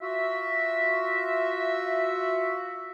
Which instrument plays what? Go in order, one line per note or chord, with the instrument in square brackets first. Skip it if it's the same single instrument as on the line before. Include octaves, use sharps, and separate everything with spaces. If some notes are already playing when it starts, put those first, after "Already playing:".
[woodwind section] F4 F#4 E5